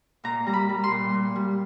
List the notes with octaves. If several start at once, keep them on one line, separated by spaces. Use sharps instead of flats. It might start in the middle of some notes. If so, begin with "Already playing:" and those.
A#2 A#5
G3 A#5
B5
G3
C6
A#2
A#2
G3